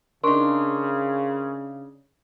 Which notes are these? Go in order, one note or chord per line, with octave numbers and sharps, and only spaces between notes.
C#3 D4 D#4 A#4 C6 C#6